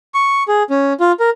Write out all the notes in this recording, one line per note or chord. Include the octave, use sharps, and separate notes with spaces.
C#6
G#4
C#4
F4
A#4